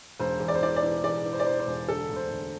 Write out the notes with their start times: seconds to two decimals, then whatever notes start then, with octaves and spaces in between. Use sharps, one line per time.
0.20 E1 C5
0.40 E2
0.48 D5
0.55 C5
0.62 E3 D5
0.76 D5
0.83 E3
1.04 E2 D5
1.25 E3
1.33 C5
1.40 D5
1.46 E3 C5
1.60 C5
1.67 E1
1.88 D3 A4
2.10 D2
2.16 C5
2.31 D2